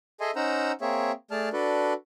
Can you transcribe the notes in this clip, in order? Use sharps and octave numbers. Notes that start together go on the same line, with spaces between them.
G#4 A4 D#5 E5 G#5 C6
C#4 D#4 C5 F#5 A#5 E6
A#3 C4 G#4 C#5 E5
A3 G#4 D5 A5 F6
D4 F#4 A4 B4 D5